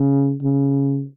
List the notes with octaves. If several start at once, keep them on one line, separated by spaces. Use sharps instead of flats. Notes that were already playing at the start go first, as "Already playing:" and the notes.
Already playing: C#3
C#3